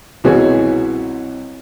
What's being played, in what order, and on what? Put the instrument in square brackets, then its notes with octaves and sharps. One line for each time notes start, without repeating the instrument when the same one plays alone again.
[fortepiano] C2 B2 E3 F#4 G#4 C#5